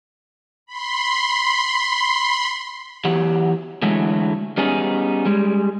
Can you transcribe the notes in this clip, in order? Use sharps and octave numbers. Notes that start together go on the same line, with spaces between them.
B5 C6
E2 E3 F#3 G4 F#5
D3 E3 F#3 G#3 A3
G3 B3 C#4 D#4 G#4
G3 G#3